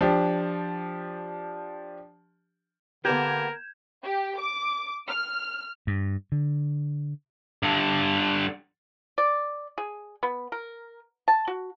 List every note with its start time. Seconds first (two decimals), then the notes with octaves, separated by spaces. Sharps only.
0.01 F3 D4 G4
3.05 D3 A#3 B3 G4 A#4 G6 G#6 E7
4.04 G4
4.39 D6
5.08 F6
5.87 G2
6.32 D3
7.63 G2 D3
9.18 D5
9.78 G#4
10.23 B3
10.52 A#4
11.28 A5
11.47 F#4